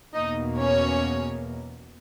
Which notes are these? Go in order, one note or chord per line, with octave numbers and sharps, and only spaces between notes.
E2 B2 A#3 D#4 D#5
C#4 C#5